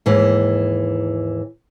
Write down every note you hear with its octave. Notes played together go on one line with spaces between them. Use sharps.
D#2 G#2 E3